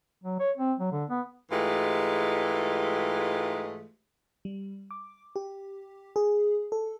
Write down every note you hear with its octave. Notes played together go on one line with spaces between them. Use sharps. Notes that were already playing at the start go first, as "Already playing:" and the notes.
F#3
C#5
C4
F#3
D3
B3
G#2 E3 G#3 A3 F4 G4
G3
D6
G4
G#4
A4